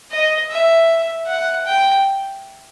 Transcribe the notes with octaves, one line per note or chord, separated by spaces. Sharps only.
D#5
E5
F#5
G5